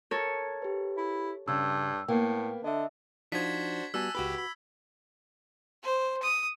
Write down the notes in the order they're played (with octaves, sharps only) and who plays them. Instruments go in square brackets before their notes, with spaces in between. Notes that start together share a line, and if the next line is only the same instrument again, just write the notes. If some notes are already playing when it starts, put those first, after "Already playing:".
[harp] A4 A#4 C#5 [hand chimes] G#6
[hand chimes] G4 B4
[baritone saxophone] E4
[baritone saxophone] G2 [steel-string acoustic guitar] C#3 [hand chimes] E6
[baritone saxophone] A2 [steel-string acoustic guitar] A#3 B3 [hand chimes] G5
[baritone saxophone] D3 [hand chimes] D#5 E5
[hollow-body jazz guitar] F3 D#4 [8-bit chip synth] D4 F#4 C5 [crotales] G#6 B6
[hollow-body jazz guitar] G3 B3 F#4 [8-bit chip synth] G#5 A5 F#6 [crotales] E6
[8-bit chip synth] C#2 G4 B5 [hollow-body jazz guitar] F#4 B4
[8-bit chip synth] B5
[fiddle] C5
D#6